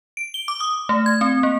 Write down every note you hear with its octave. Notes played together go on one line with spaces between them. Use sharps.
D7
G7
D6
D#6
A3
G#6
C4
A#3